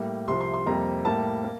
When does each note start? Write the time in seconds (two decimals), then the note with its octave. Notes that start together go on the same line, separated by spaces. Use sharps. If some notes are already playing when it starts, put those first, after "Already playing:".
Already playing: A2 G3 A#3
0.27 C2 C3 F3 C6
0.41 C6
0.54 C6
0.66 F2 C3 G3 A#3 A#5
1.05 A2 G3 A#3 A5
1.44 A#3